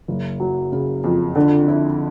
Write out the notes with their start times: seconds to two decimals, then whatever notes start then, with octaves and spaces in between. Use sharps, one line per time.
0.08 F#1
0.40 F#3
0.72 C#3
1.04 F2
1.35 D3
1.68 E4